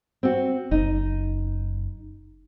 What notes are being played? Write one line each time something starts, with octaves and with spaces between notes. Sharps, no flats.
C4 F#4
F#1 D#4